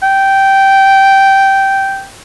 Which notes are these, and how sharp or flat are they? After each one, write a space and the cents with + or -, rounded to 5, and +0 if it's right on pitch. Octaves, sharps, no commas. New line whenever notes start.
G5 -10